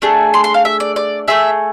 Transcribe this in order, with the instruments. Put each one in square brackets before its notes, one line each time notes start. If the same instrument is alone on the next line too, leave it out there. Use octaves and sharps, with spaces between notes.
[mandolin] A3 D4 G#4
C6
C6
F5
E5
D5
D5
A3 C4 G#4 E5